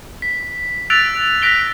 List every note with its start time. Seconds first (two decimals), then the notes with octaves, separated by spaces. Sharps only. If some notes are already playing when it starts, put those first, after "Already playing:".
0.22 B6
0.90 E6 F#6 A6 B6 D7 F7
1.42 F#6 A#6 B6 D7 F7 G7